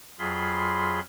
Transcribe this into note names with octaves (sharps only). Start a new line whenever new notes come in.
F2 F#3 F4 G#4 B5 C6